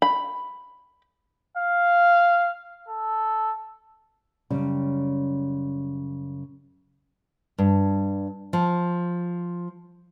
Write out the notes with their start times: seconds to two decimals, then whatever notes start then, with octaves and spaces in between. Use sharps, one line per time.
0.02 B5
1.57 F5
2.89 A4
4.50 F#2 C#3 G3
7.58 G2
8.53 F3